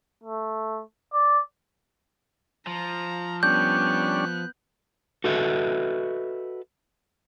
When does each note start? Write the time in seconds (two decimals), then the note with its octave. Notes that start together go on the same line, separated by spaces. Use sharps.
0.23 A3
1.13 D5
2.67 F3 A#5
3.43 G3 B3 C#4 D4 F#6 G6
5.24 F#4 A4 B4 D#5 E5